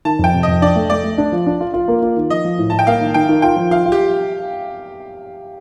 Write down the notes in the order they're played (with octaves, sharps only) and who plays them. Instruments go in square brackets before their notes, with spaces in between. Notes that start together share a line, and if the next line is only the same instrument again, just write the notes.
[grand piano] D#3 [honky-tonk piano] A5
[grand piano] F2 [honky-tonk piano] G5
[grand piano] C3
[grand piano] F2 [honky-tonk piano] D#5
[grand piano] D4 [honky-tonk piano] D5
[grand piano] A3
[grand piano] A3 [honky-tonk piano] D5
[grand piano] A3
D4
F3
D4
F4
F4
A#3
F4
D#3
[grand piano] F3 [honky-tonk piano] D#5
[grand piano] F3
A2
[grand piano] A2 [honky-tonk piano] A5
[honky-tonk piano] G5
[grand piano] A#3 [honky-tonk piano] F5
[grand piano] D#3
[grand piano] D#3 [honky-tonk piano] G5
[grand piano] D#3
[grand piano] F4 [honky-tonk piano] G5
[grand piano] F3
[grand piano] F4 [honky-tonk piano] F5
[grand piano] F4
[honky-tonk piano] G4